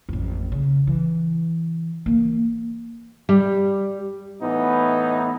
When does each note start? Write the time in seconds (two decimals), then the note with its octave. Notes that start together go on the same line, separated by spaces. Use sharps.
0.09 A1 F2
0.52 C#3
0.87 E3
2.06 E3 A#3
3.29 G3
4.42 A2 E3 B3 D#4